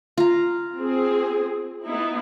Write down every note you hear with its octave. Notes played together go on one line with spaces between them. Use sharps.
F4 A#5
C4 G#4
B3 D#4 E4